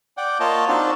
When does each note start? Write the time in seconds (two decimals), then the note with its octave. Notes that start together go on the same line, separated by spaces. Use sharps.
0.17 D5 F#5 G5
0.40 A#3 F4 C#5 D#5 A5
0.68 C4 D4 D#4 F4 F#4 A5